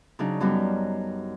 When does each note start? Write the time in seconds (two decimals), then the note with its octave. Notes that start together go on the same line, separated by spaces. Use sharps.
0.19 C#3 F#3 D4 D#4
0.40 F#2 F#3 G3 B3